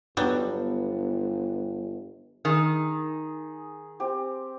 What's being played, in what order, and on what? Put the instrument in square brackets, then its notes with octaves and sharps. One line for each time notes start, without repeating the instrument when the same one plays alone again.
[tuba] G1 [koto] F#3 G3 [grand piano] B3 D4
[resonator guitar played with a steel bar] D#3 [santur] G#4
[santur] C4 G4